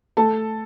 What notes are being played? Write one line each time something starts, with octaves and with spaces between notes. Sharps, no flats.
A3 A4 A5